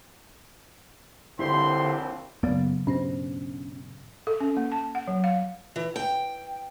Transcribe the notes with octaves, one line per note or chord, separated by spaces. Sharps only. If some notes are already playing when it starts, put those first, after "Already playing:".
A#1 D#2 D3 C4 E4 G4 C5 C6
F#2 C#3 F#3 A#3 B3 D5
G2 B2 C#4 D4 C5 A#6
A4
C#4
A#3
A5
F#5
F#3
F5
E3
G5